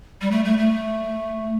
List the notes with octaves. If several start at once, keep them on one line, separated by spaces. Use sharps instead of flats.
G3
A3
A3
A3